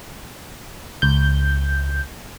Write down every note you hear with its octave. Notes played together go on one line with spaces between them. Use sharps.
C#2 G6